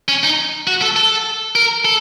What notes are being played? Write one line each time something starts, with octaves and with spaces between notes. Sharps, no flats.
C#4
D#4
F#4
A4
A4
A#4
A4